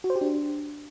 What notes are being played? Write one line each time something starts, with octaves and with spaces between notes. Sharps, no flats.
F#4
C5
G4
D4